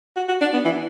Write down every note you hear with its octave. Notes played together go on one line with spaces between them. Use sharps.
F#4
F#4
D4
B3
E3